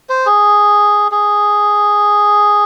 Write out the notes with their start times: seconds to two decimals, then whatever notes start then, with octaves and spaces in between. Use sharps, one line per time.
0.09 C5
0.26 G#4
1.12 G#4